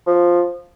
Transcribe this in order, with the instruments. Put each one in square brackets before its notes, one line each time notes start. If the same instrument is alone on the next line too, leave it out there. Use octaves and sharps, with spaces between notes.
[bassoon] F3